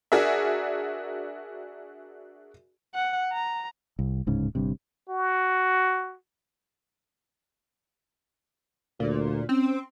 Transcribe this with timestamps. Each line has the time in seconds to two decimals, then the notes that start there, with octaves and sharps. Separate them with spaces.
0.12 D4 F#4 G#4 A#4 E5
2.94 F#5
3.32 A#5
3.99 C2
4.27 D1 G#2 C#3
4.55 G1 G2 C3
5.09 F#4
9.00 D2 A#2
9.49 C4 C#4